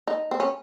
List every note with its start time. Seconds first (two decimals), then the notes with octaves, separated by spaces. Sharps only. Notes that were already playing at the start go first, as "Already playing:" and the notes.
0.07 D#4
0.31 C4
0.40 C#4